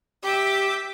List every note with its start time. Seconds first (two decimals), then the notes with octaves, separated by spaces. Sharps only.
0.24 G4 E5 D6 G6